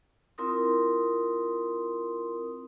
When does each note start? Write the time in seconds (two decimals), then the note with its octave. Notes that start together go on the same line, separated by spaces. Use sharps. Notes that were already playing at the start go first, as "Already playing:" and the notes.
0.38 C4 E4 F4 A#4 C6 D#6